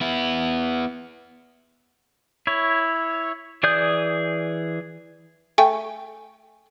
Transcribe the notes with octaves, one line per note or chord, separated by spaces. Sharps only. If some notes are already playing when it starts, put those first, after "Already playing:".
B3 E4
E4 C#5
E3 G#4 D5 D#6 G6
A3 G5 G#5